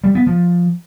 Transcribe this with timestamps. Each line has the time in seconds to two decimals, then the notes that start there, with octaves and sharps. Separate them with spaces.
0.04 G3
0.15 B3
0.27 F3